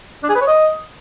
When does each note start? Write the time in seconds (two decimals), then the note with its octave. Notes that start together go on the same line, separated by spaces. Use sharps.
0.23 D4
0.29 G#4
0.35 B4
0.41 C#5
0.47 D#5